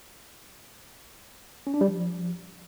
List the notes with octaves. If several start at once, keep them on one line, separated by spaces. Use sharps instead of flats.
C#4
D4
G3
F3